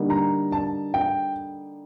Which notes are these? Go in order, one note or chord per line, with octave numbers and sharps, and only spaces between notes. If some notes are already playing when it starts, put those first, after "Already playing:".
Already playing: D3 G3 A#3 D#4
A#5
A5
G5